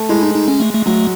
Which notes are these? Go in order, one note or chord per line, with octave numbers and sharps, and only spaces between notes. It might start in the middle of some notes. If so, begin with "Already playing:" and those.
Already playing: A3
G#3 E4
D#4
D#4
C#4
A3
A3
F#3 A3